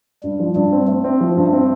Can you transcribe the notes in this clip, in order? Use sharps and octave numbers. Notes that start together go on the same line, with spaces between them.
G2 G3
F3
G2 G3
C4
A3 C4
C4
F3
G2
C4